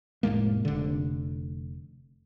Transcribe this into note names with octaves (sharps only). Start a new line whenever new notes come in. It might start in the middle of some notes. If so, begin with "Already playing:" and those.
F1 A2 G#3 A#3
F1 D3